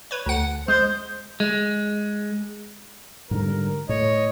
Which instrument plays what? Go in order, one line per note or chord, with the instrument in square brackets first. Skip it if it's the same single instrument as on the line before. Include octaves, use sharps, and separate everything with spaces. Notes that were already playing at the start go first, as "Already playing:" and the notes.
[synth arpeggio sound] B4 C#5
D2 F#5
[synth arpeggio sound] G#3 [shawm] C5
[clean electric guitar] G#3
[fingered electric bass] G#2 D3 G3 [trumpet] A#4
[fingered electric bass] A2 [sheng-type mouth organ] C#5 [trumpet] D#5